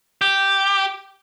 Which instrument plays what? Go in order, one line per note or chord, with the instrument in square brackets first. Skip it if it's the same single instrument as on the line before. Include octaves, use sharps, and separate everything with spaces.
[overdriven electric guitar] G4